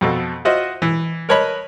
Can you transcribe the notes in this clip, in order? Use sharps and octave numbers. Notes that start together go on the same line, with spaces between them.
F2 B2 A4
F4 F#4 C5 D#5 E5 F#5
E3
A#4 B4 C#5 D#5 A5 B5